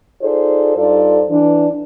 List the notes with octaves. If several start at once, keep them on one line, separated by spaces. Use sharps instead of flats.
D#4 F4 G#4 A4 C5 D5
G2 D#4 F4 A4 C5 D5
E3 D4